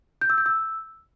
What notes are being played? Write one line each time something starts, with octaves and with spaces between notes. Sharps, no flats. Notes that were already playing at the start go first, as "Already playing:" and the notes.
G6
E6
G6
E6